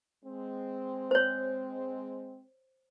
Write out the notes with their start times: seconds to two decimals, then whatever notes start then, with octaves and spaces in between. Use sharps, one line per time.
0.25 G#3 C4
1.11 C5 C#5